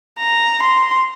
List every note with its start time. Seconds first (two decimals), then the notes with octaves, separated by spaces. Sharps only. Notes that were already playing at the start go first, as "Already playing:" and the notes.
0.19 A#5
0.62 C6